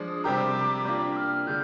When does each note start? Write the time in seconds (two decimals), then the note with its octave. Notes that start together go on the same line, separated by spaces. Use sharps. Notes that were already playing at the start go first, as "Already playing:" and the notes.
Already playing: F3 G#3 D4
0.08 D#6
0.24 C3 G3 C4 G4 A#4 D6
0.85 G3 A#3 D4 F4 D6
1.17 F6
1.47 D3 G#3 G6